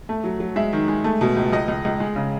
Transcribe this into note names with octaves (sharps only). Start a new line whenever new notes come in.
A3
F#3
F#3
G#3 E5
D#3
G#3
A3
B2
C#2
C#2 D#5
C#2
C#2
G#3
C#3